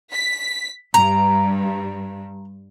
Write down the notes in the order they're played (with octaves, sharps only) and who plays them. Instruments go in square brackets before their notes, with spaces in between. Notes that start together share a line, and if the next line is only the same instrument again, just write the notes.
[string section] B6
[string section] G2 [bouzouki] A#5